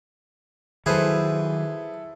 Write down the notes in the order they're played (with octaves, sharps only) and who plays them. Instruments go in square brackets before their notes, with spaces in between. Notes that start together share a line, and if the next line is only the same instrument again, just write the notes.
[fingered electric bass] D#3 F#3 [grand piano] E4 A4 [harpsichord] G#4 B4 C5